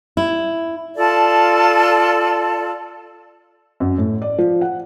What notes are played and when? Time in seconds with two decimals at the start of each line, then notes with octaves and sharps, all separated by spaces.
0.17 E4
0.96 F4 A4 D5 A5
3.80 F#2
3.98 A2
4.22 D5
4.38 F3
4.61 F#5